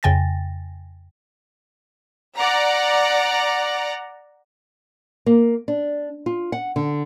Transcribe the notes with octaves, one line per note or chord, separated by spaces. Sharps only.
F2 C#3 G5 G#5 A6 A#6
D5 F#5 A#5
A#3
D4
F4
F#5
D3